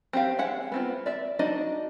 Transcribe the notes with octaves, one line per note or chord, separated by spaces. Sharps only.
C4 G4 F5
G#3 E5 F#5
B3 C4 F4
D5 E5
D4 D#4 F#4 D5 D#5